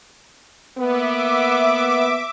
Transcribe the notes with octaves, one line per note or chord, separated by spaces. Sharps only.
A#3 B3 E5 D6